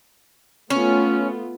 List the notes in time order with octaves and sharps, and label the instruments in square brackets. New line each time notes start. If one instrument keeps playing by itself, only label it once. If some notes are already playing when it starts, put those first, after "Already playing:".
[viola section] A3 B3 F4 [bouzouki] C#4